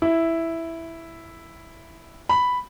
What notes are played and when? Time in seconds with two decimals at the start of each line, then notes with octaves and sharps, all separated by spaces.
0.02 E4
2.29 B5